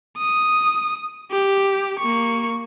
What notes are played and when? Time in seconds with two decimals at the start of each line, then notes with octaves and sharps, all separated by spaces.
0.18 D#6
1.32 G4
1.99 A#3 C#6